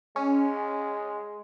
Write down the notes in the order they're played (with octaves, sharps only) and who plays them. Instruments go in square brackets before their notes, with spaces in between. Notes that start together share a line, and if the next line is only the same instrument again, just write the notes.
[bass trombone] G#3 [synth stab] C#4